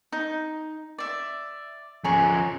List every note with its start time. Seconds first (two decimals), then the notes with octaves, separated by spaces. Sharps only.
0.12 D#4
0.98 D5 E5
2.04 F3 C#4 G#4 A#5 C#6